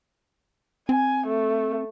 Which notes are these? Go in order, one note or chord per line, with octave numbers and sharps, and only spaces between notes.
C4 G#5
A3